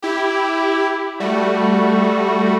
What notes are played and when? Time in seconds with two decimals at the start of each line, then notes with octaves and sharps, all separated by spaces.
0.02 E4 G4
1.20 G3 A3 F#4